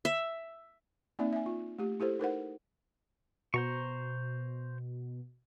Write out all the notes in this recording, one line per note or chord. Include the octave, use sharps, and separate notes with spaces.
E5
A#3 C4 D#4 D5 E5
E5 G#5
F4
A3 G4
E4 G4 A4 C5
D#4 A#4 C5 F#5
B2 C5 A#5 C#6